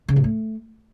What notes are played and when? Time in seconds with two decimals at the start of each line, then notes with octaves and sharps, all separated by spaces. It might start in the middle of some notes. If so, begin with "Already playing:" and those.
0.08 C#3
0.16 A2
0.24 A3